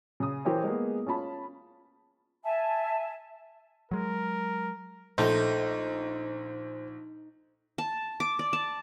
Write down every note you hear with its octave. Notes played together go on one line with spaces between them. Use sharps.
C#3 D#6
E3 G4 A#4 C5 C#5
G#3 A#3 B3 G#4
C#4 F4 A5 B5
E5 G#5 A5
F#3 G#3 A#4
A#1 A3 D#4 C5 G5
A5
D6
D5
A5